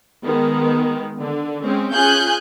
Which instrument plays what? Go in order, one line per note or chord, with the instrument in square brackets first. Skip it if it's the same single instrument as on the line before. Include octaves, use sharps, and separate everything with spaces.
[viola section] D#3 G#3 B3
D3
G#3 C4 C#4
[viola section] C#4 F4 G#4 [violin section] G#5 F#6 G6